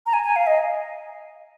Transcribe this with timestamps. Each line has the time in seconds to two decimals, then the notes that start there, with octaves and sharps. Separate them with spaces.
0.06 A#5
0.13 G#5
0.24 G#5
0.36 F5
0.47 D#5